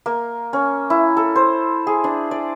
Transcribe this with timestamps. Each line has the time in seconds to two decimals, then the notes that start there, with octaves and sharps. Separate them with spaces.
0.06 A#3
0.53 C#4
0.90 E4
1.17 A4
1.36 C5
1.87 G#4
2.04 D4
2.31 D5